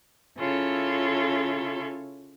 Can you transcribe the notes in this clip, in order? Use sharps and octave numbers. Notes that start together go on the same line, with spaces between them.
C#3 E4 F4 A4 C#5